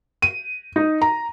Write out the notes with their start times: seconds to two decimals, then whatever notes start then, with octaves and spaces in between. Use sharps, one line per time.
0.22 D#7
0.76 D#4
1.02 A#5